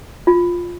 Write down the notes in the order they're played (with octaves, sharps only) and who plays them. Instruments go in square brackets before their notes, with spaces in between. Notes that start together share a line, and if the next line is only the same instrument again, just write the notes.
[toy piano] F4